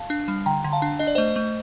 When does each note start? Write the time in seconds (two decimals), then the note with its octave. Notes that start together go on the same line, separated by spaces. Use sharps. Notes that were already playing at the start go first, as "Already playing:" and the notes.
Already playing: F5 A5
0.10 D4
0.28 G3
0.46 D3 G5 A#5
0.64 D3
0.73 F5 A5
0.82 D4
0.99 D4 D#5
1.07 D5
1.15 A3 C5 D#5
1.36 A3